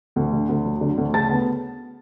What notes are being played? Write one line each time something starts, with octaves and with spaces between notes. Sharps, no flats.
D2
D3
D2
F#3
D3
D2
C#3 A5 A6
B3